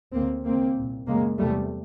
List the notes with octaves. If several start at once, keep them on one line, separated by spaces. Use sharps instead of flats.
D2 C#3 A#3 C4
D#2 C#3 A#3 C4
C2 A#2
F#2 C#3 G#3 A#3
E2 C3 G3 A3